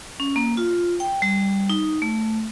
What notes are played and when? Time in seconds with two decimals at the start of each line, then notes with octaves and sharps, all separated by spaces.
0.20 C#4
0.36 A#3
0.57 F4
1.00 G5
1.22 G3
1.70 D#4
2.02 A3